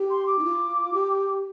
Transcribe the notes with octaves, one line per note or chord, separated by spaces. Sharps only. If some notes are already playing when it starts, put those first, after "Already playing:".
Already playing: G4
C6
D6
D#4
F4
G4